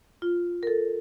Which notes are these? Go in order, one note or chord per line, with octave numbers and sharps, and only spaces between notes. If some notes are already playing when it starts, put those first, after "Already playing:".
F4
A#4
A4